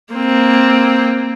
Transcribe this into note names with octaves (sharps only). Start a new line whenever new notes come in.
A#3 C4